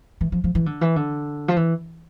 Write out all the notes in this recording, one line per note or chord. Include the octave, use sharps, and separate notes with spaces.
E3
F3
F3
E3
D3
E3
D3
F3
E3